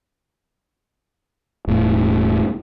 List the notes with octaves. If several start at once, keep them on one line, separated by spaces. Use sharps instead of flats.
E1 A2